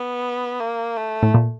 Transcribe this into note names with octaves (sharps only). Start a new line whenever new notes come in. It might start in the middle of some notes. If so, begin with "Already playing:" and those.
Already playing: B3
A#3
A3
A2
A#2